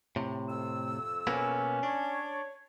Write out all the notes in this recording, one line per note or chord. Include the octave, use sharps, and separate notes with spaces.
A2 C3
F2 E6
B2 A#3 B3 C#4
D4 C#5